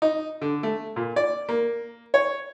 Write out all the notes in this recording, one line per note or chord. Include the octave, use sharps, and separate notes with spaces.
D#4
D3
A3
A#2
D5
A#3
C#5